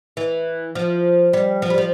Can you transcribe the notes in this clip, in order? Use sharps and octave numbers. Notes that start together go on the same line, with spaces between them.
E3
F3
G3
F3
G3
F3